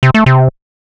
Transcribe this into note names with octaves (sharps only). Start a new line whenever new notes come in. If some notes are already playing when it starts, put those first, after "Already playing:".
C3
A3
C3